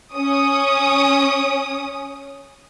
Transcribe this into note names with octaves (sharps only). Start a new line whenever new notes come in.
C#4 D#6